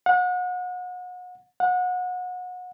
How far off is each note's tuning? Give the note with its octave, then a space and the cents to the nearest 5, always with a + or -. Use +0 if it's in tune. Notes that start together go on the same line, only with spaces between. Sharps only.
F#5 -35
F#5 -30